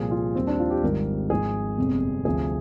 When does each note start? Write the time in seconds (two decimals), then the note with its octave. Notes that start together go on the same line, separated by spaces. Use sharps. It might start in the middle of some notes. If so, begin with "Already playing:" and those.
Already playing: C2 A#2 F3 G#4
0.11 F4
0.35 D#2 D#3 G3 C4
0.47 D4
0.60 F4
0.70 G4
0.83 G#1 G#2 D#3 G3 A#4
1.30 G#1 G#2 F3 G#3 G#4
1.78 G1 F2 C3
2.25 D2 C3 F3 G#4